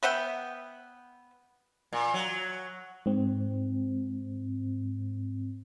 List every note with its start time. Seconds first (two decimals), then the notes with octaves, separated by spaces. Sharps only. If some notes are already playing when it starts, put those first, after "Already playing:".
0.03 B3 E5 F#5 G5
1.93 A#2
2.14 F#3
3.06 G#2 C4